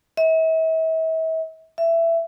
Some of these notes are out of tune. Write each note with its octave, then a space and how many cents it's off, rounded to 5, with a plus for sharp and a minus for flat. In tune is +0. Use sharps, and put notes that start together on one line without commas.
E5 -40
E5 +15